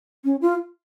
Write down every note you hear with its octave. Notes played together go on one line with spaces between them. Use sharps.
C#4
F4